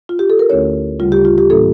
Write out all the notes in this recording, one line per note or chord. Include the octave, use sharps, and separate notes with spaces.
F4
G4
A4
A#4
D2 D3 A3 C#4 E4 C#5
D2 C#3 G3 F4
G4
F4
G4
A2 E3 A#3 D4 A4